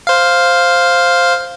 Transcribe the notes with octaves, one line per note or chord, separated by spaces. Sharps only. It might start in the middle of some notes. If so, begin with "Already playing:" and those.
C5 F5